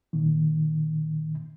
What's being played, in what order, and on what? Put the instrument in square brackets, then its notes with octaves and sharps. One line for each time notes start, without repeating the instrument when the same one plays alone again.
[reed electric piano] A#2 D#3